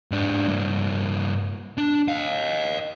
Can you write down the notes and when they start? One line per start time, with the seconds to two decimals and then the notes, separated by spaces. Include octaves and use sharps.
0.11 G#2 D4
0.48 G2 A#3
1.78 D4
2.08 D#5 F5